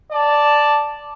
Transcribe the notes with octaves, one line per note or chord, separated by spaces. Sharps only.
D5 A5